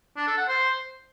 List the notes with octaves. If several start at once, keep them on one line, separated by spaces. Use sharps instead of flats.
D4
A4
F#5
C5